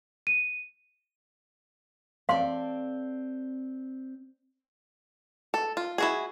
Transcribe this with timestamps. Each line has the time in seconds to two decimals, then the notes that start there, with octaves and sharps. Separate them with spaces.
0.27 D#7
2.29 C4 A4 D5 F5 C6
5.54 A4
5.77 F4
5.98 E4 F#4 G#4